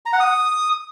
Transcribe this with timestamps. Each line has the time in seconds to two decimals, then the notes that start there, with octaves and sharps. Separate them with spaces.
0.06 A#5
0.13 F#5
0.20 D#6